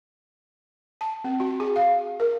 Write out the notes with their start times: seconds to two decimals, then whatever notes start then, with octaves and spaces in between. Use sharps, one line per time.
1.01 A5
1.24 C4
1.40 F#4
1.60 G#4
1.76 F5
2.20 A#4